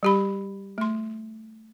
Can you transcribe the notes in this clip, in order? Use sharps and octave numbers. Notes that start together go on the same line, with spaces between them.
G3 G4 B5
A3 C6